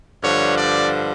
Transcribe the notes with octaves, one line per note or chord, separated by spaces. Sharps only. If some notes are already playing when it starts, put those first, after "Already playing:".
G2 D3 F3 C#5
D5